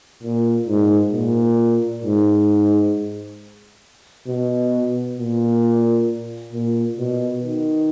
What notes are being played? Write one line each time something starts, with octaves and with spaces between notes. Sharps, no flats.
A#2
G#2
A#2
G#2
B2
A#2
A#2
B2
D#3